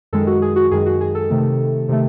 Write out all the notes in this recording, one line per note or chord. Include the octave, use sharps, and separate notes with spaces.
F#2 D#3 G#3 A4
F#4
G#4
F#4
F#2 D#3 G#3 G#4
F#4
G#4
A4
C3 D#3 A3
C3 D#3 A3